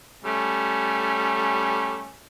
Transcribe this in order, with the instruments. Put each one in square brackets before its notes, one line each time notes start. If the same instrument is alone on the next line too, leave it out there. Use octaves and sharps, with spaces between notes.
[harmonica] G3 A3 C#4